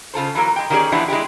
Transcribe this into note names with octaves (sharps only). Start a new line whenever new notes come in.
C#3 F4 A4 C5
E3 F#3 A#3 A#4
G#3 G5
D#3 A#3 C#4 G4 G#4 D5
E3 F3 G#3 B3 D4 E4
G#3 D4 E4 G4